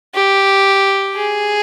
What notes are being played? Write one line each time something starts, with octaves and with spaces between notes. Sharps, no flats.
G4
G#4